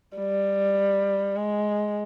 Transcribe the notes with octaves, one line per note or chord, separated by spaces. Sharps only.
G3
G#3